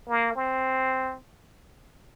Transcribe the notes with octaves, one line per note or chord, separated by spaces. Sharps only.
A#3
C4